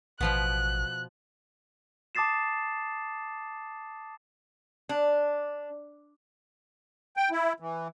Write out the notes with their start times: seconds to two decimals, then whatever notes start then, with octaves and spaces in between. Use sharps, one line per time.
0.21 A1 B2 F3 B3 F#6
2.15 A5 D6 D#6 A6 C7 E7
4.89 D4
7.17 G5
7.31 E4
7.60 E3